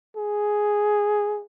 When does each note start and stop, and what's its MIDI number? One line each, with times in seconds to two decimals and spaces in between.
0.17 1.43 68